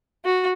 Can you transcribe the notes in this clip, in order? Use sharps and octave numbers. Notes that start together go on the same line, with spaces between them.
F#4